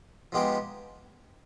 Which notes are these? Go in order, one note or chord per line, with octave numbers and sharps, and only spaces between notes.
F3 G#3 B3 D#4 G4